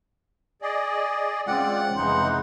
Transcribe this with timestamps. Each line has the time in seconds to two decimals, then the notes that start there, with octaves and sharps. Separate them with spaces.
0.62 G#4 D5 D#5
1.47 G#3 C4 C#4 F4 D5 F#5 G5
1.96 F1 C#3 E3 G#3 D#4 C6